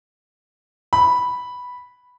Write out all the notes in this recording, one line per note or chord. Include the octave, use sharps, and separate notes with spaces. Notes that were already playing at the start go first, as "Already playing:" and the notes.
B5